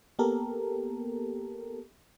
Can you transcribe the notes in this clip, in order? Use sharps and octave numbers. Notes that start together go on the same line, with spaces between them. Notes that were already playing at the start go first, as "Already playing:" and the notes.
A#3 B3 G4 A4 A#4